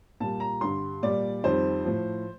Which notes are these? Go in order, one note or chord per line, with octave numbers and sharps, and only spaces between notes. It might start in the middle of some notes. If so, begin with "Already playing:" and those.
A#2 G3 A5
A#5
G2 D3 G3 C6
A#2 G3 D5
F2 D#3 G3 C5
A2 F3